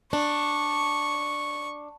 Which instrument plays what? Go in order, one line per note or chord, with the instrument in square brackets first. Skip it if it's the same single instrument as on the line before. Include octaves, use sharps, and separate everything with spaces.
[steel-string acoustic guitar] D4 [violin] C#6